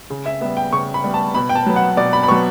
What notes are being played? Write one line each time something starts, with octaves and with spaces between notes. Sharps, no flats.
C#3
E5
G3 B3 E5
G5
C#3 C#6
B5
G3 B3
A5
B2 B5
G5
A5
F#3 B3
F#5
B2 D5
B5
B5
F#3 B3 C#6